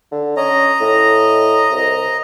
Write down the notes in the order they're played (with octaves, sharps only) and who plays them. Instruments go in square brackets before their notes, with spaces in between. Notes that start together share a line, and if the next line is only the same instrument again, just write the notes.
[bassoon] D3
[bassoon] C#4 [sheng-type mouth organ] D#5 A#5
[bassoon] A2
C2